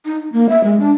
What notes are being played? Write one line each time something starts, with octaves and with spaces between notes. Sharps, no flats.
D#4
A#3
E5
G#3
D4